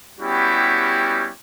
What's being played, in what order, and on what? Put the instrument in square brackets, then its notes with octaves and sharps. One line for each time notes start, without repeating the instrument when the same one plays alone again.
[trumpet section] G3 B3 C#4 E4 F#4 G4